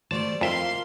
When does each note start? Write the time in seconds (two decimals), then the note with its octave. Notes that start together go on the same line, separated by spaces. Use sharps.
0.11 G3 A3 C5 D5 A5
0.41 F2 A#3 F4 E5 F5 C6